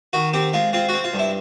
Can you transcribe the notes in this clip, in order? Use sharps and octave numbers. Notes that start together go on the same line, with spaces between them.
D#3 F#4
C4 G4
G#3 F4
C4 F4
C4 F#4
F4
G2
E4